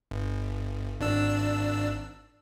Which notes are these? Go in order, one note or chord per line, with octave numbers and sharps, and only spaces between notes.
G1
G#1 D4 E6